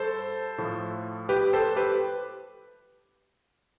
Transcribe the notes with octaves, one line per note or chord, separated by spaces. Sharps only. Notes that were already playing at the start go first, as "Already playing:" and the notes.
Already playing: G2 A4 C5
A2 F3 A3
G4 B4
A4 C5
G4 B4